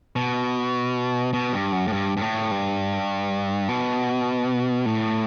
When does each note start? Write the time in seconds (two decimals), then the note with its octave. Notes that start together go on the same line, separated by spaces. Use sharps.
0.16 B2
1.33 B2
1.52 G2
1.72 F#2
1.87 A2
1.92 G2
2.17 G2
2.21 A2
2.51 G2
3.69 B2
4.86 A2